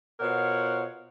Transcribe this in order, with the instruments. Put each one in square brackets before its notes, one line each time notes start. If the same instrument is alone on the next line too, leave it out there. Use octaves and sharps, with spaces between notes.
[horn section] B2 F4 A#4 C5 C#5 F#5